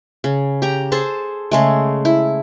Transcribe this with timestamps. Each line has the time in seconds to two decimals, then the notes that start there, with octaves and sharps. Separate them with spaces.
0.24 C#3
0.62 G4 A#5
0.92 G#4 A4 C5 A5
1.51 C#3 G#3 A3
2.05 E4